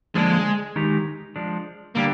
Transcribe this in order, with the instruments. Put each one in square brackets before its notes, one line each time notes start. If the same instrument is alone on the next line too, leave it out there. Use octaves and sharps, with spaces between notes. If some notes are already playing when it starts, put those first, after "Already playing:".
[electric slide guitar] D3 F3 A#3 D4 [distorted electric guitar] G#3
[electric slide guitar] D#3 G#3 D#4 G4
F3 G#3 D4
[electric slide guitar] D3 G3 D4 G4 [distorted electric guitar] A#3